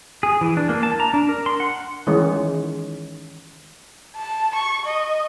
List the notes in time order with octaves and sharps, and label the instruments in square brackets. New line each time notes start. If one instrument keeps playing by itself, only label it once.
[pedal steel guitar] G#4
E3
D4
A#3
A5
A#5
D4
A#4
C6
F#5
[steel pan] D#3 E3 G#3 C#4
[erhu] A5
C#6
D#5